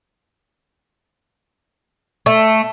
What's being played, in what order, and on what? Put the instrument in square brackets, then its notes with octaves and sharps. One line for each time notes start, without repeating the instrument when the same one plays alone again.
[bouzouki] A3